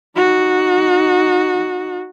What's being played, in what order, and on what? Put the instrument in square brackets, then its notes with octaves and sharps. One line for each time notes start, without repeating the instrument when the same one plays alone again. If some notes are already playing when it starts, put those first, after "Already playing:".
[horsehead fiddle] D#4 F#4